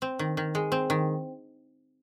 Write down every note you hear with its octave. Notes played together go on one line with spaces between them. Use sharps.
C4
D#3
D#3
G#3
C4
D#3